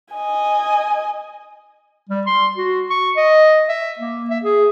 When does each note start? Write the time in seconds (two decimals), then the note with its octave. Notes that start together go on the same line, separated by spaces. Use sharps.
0.14 D#5 G#5
2.09 G3
2.26 C6
2.57 F#4
2.90 C#6
3.16 D#5
3.69 E5
3.99 A#3
4.30 E5
4.44 G#4